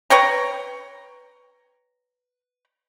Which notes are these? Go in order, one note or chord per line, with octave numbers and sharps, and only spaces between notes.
B4 C#5 G5 A#5